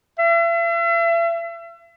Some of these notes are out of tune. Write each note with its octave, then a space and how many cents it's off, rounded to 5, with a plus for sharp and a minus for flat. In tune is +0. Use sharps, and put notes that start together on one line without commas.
E5 +40